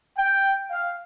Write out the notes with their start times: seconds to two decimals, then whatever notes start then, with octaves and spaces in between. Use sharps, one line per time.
0.16 G5
0.70 F5